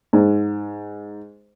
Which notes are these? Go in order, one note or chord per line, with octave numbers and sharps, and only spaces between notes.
G#2